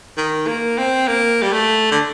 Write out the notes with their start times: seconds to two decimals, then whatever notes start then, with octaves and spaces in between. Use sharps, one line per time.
0.17 D#3
0.47 A#3
0.78 C4
1.07 A#3
1.42 G3
1.53 A3
1.91 D3